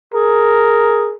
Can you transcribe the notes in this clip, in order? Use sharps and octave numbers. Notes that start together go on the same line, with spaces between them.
G#4 A#4